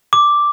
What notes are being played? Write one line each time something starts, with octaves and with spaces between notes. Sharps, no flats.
D6